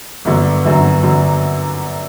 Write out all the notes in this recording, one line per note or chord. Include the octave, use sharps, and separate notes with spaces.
G1 F#2 D3 F#3
G1 F#2 D3 F#3
D3 F#3